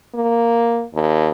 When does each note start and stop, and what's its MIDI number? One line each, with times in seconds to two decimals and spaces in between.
0.15 0.84 58
0.94 1.31 39